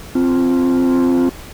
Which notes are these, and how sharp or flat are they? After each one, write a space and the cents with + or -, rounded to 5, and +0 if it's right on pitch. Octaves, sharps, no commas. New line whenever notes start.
C4 +0 F4 -5